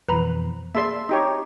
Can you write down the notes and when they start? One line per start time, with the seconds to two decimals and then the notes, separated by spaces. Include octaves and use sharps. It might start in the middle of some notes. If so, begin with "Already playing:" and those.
0.09 F2 B2 E3 B4 A#5 B5
0.75 A#3 G#4 D5 E5 A5 C6
1.09 D#4 G4 C#5